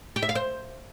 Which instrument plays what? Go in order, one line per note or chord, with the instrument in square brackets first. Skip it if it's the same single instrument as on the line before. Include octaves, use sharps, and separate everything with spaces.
[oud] G4
E5
F5
C5